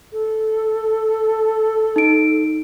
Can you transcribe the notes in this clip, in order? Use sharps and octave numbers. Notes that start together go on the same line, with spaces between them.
A4
D#4 D7